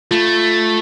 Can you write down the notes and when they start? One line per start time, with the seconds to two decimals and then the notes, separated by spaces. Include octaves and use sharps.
0.11 A3 F4